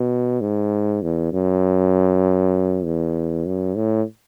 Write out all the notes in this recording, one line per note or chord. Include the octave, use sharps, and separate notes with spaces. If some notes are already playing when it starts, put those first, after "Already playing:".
Already playing: B2
G#2
E2
F#2
E2
F#2
A2